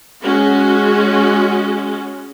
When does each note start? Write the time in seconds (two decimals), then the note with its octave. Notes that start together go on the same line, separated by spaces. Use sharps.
0.22 G#3 C#4 F#4 G#4